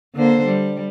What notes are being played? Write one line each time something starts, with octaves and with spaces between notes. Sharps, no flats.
D3 A#3 C5
G3